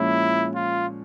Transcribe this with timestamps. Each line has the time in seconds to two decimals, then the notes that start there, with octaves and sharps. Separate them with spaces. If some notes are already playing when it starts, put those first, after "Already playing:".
Already playing: A#2 F3 G#3 C#4 E4
0.55 F4